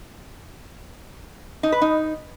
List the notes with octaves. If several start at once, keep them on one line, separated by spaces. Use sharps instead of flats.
D#4
B4
D#4